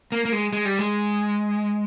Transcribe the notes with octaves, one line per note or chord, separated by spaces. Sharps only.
A#3
A#3
G#3
G#3
G3
G#3